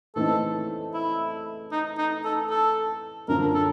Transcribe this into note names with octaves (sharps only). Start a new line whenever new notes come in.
C#3 E3 A3 C4 D#4 A4
E4
D#4
D#4
A4
A4
F#2 D3 F3 A#4
A4